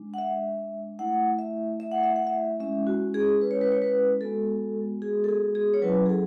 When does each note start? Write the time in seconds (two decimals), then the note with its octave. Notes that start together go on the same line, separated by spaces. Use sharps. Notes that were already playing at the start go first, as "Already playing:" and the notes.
Already playing: G#3 D4
0.14 F#5
0.18 E5
0.99 A3 E4 F#5
1.39 E5
1.80 E5
1.92 F#5
2.03 E5
2.16 F#5
2.27 E5
2.60 G#3 C#4 E4 E5
2.87 F#4
3.14 G#4
3.41 B4
3.51 C#5
3.61 B4
3.72 C#5
3.82 B4
4.21 G#3 B3 F#4 A4
5.02 G#4
5.24 A4
5.29 G#4
5.55 G#4
5.74 C#5
5.82 F#3 C#4 E4 B4
6.06 G#4
6.09 A4